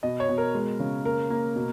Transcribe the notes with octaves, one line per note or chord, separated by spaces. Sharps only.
B2 D#5
C#5
B2
A#4
G#3
C#3
A#3 A#4
A#3
B2